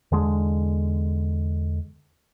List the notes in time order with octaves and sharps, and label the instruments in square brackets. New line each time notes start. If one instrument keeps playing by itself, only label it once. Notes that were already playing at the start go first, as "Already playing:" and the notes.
[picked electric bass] E2 D3 G#3